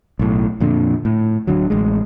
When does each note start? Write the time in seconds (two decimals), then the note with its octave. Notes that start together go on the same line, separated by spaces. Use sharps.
0.19 B1 A2
0.60 F2 A#2 D3
1.05 A2
1.47 D1 D#2 D3 F#3
1.70 A1 G#3